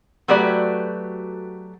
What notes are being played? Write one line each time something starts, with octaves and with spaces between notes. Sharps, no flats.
F#3 A3 F#4 G4 B4 D5